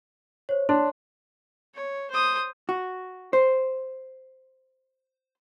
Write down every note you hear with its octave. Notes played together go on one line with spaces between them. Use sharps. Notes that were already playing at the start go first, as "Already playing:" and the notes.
C5 C#5
D4 C#5 C6
C#5
C5 D#6
F#4
C5